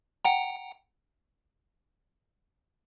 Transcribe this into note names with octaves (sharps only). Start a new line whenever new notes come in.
F#5 G5 A#5